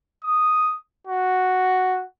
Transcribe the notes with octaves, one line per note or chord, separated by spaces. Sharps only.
D#6
F#4